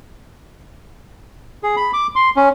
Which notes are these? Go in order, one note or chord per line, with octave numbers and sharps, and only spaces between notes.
G#4
B5
D6
C6
C#4